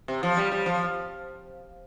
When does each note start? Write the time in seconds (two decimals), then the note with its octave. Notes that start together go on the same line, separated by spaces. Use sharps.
0.08 C3
0.23 F3
0.37 G3
0.52 G3
0.66 F3